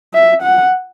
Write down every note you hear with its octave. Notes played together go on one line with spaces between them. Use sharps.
E5
F#5